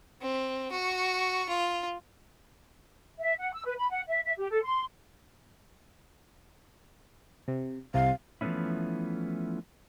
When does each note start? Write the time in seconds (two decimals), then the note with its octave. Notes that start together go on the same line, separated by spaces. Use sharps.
0.22 C4
0.71 F#4 C#6
1.49 F4
3.19 E5
3.38 F#5
3.53 E6
3.65 B4
3.77 B5
3.90 F#5
4.08 E5
4.24 E5
4.38 G4
4.50 A4
4.63 C6
7.48 C3
7.94 C2 C3 F5
8.41 E3 F3 A3 B3 C#4 E4